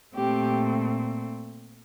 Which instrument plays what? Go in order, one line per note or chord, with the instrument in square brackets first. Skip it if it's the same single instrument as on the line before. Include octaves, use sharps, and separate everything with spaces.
[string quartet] A#2 A3 C4 G4